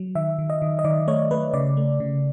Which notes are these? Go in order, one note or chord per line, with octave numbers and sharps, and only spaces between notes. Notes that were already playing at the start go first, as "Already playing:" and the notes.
Already playing: F#3
D#3 E5
D#3
D#5
D#3
D#5
D#3 D5
A3 C#5
A3 B4
C#3 D5
A3
C#3